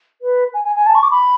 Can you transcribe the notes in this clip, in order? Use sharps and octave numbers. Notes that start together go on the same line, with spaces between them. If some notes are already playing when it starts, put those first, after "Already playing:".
B4
G#5
G#5
G#5
A5
C#6
D6
B5